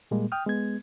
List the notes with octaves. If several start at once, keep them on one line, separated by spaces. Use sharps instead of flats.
A#2 G3 G#3 A#3
G5 D#6 F6
G#3 B3 G#6